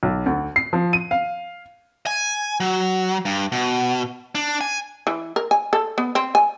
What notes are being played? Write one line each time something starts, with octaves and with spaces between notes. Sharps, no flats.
B1
D2
C7
F3
D#7
F5
G#5
F#3
G2
B2
D4
G#5
E3
A#4
G#5
A4
B3
C4
G#5